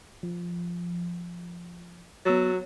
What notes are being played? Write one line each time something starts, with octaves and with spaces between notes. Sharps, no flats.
F3
F#3 B3 E6 A6